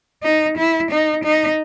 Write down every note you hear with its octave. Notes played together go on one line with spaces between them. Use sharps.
D#4
E4
D#4
D#4